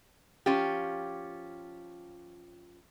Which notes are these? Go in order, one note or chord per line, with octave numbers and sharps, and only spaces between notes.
F3 C#4 F4 G4